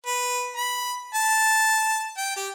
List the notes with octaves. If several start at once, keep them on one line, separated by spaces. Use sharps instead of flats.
B4
B5
A5
G5
G4